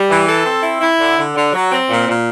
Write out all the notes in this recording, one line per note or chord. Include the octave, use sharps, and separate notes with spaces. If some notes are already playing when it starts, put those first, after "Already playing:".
Already playing: G3
E3
A4
C4
E4
E4
D3
D3
D3
F#3
C4
A#2
A#2